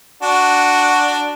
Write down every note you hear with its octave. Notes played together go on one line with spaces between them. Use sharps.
D4 F#4